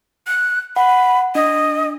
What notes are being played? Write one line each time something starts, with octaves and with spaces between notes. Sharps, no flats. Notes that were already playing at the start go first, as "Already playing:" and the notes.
F#6
F#5 B5
D4 D#5